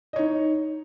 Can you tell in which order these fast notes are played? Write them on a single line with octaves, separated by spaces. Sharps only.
D#5 C#5 D#4